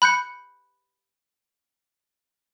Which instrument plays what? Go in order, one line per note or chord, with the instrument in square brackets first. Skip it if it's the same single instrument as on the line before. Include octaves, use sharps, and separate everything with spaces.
[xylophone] B5 F#6 G6 C#7